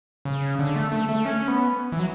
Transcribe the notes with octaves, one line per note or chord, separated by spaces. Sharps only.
C#3
D3
A3
A3
A3
C#4
B3
E3
F#3